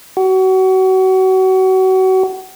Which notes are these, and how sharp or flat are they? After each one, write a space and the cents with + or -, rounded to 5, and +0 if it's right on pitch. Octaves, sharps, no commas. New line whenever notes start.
F#4 +30